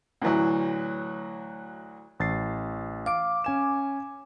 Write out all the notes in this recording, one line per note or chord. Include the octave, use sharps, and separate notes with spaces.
D2 A2 E3 F#3 E4
A1 A6 C7
F5 D6 D7
C#4 G#5 E7